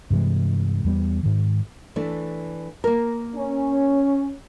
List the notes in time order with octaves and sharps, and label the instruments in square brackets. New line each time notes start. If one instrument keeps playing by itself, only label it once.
[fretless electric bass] G2 C3 E3 G#3
E2 G3 B3
G#2 D#3
[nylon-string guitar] E3 A3 D4
A#3 A#4
[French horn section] C#4